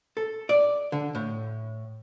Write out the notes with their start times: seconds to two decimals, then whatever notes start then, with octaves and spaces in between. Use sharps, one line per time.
0.17 A4
0.49 D5
0.92 D3
1.15 A2